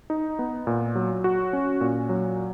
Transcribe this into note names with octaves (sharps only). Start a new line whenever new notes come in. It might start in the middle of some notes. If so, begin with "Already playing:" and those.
D#4
B3
A#2
F#3
F#4
C#4
A#2
F#3